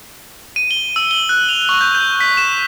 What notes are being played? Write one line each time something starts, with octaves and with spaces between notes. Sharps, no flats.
D#7
G7
E6
G7
F#6
F7
C#6
G6
G6
B6
E7